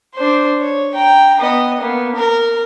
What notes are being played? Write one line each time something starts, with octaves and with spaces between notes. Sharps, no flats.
D4 C5
C#5
G5 A#5
B3 D#5
A#3 B3
A#4